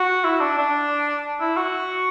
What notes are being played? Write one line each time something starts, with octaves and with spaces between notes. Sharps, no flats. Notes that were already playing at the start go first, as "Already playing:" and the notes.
Already playing: F#4
E4
D4
D4
E4
F#4